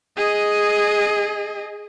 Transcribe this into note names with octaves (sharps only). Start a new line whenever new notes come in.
G#4 D#5